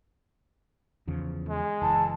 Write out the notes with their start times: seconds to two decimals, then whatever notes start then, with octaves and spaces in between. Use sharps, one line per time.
1.08 E2 C#3 F3
1.49 G#3
1.82 F#1 E3 A5